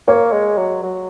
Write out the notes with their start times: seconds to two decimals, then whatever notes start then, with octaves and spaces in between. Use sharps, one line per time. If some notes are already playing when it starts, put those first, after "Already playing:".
0.08 A#3 C#5
0.33 G#3
0.58 F#3
0.83 F#3